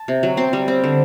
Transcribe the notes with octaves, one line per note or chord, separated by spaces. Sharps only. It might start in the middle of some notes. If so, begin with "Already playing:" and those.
Already playing: A5
C3
F#3
C4 C6
G3
C4
D3